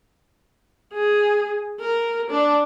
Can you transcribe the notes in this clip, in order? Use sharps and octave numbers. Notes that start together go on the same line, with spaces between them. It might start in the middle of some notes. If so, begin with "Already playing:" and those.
G#4
A#4
D4